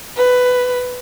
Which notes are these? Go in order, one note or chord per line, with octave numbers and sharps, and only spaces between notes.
B4